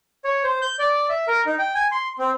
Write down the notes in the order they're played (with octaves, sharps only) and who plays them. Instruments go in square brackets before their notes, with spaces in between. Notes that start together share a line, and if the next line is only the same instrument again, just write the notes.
[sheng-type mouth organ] C#5
C5
G6
D5
E5
A#4
D#4
G5
G#5
C6
C4